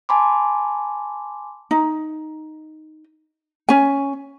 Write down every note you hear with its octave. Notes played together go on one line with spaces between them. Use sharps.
G#5 A5 B5 C6 D6
D#4
C#4 G#5